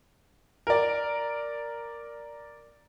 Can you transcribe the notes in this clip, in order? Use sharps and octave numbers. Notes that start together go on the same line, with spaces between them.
A#4 D5